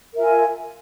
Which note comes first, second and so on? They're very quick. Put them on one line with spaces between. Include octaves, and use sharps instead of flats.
A#4 E5 F4 G#5